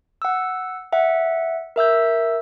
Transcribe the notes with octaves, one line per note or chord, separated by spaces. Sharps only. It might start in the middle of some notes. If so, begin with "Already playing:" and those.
F#5 E6
E5 F#5
A#4 E5 E6 G6